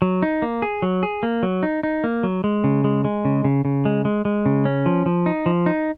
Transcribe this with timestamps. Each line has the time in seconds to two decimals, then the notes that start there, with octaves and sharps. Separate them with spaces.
0.02 F#3
0.22 D#4
0.42 A#3
0.62 G#4
0.82 F#3
1.03 G#4
1.23 A#3
1.43 F#3
1.63 D#4
1.83 D#4
2.04 A#3
2.23 F#3
2.44 G#3
2.64 C#3
2.84 G#3
3.05 G#3
3.25 C#3
3.44 C#3
3.65 C#3
3.85 G#3
4.05 G#3
4.25 G#3
4.46 C#3
4.65 C#4
4.86 F3
5.06 F3
5.26 D#4
5.46 F3
5.66 D#4